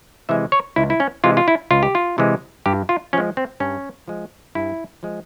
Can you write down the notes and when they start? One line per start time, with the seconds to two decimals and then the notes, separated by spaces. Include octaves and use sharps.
0.29 C3 E3 G#3 E5
0.52 C#5
0.76 C#2 E4
0.90 E4
1.00 C#4
1.24 C3 E3 G#3 F4
1.37 F4
1.48 E4
1.71 C#2 F4
1.83 G4
1.95 F4
2.18 C3 E3 G#3
2.66 G2 G4
2.89 F4
3.13 F3 G#3 C#4
3.37 C4
3.60 G2 C#4
4.08 F3 G#3
4.55 G2 E4
5.03 F3 G#3